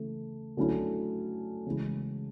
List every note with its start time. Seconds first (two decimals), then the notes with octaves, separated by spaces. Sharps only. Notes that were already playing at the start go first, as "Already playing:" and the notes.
Already playing: C#3 E3 A3
0.57 D3 F#3 A3 C#4 E4
1.66 C#3 E3 G#3